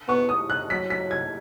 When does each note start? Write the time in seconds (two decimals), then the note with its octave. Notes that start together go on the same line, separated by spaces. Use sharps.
0.08 B3 C#6
0.29 D#6
0.50 F#6
0.70 F#3 B6
0.90 B6
1.11 G#6